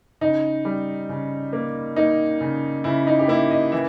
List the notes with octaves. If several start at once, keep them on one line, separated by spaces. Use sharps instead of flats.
C#3 D#4
G3
C#3
A#3
A#3 D#4
C#3
C#3 E4
D#4
G4
A#3 E4
D#5
E3 E5